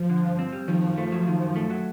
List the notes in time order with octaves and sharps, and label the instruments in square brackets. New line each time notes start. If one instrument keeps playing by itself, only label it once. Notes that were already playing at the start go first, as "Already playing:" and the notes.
Already playing: [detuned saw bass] F3
[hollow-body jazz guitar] D3
G2
C4
G3
[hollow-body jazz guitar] D#3 [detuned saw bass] F3
[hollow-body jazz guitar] F#2
A3
F#3
D#3
F#2
A3
F#3